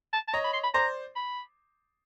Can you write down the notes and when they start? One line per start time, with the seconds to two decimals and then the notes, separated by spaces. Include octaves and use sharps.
0.13 A5
0.28 A5
0.34 C#5 D#5 A#5
0.44 B5
0.53 C6
0.64 B5
0.74 C5 D5 A#5
1.16 B5